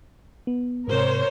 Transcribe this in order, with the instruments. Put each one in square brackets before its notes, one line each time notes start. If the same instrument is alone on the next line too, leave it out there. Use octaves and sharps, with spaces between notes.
[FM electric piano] B3
[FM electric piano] G#2 C3 [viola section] A#4 C5 C#5